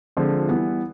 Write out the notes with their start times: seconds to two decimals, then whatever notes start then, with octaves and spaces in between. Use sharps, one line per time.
0.17 D3 F3 G#3 C4 F4
0.48 E3 G3 B3